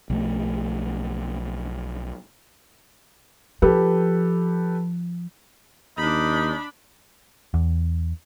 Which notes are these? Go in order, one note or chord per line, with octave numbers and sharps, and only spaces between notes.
B1 F3 A3
F3 G4 A4 B4
D#2 D4 D#4 B5
E2